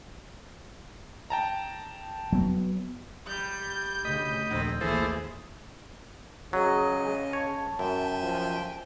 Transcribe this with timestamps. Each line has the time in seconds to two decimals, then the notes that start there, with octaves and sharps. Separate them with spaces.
1.30 G5 A5 A#5
2.33 F#3 B3
3.27 G3 G6
4.05 D2 C#3 D#5 B5
4.50 A#1 D#2 D3 C4
4.81 A1 D#2 E3 E4 G#4 A4 C5
6.53 C#3 F#3 G#4 D#5
7.33 C#5 A5
7.79 F#2 E5 G5 G#5
8.23 F3